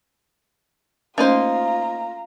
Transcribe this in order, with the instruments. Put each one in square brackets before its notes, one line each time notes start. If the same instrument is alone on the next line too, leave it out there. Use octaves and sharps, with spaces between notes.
[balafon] A3 C#4 [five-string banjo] A#3 D#4 C5 [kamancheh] F4 A#5